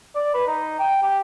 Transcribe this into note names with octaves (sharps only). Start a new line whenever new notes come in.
D5
B4
D#4
G5
G4